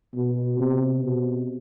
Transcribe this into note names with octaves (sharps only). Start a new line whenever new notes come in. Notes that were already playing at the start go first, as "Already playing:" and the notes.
B2
C3
B2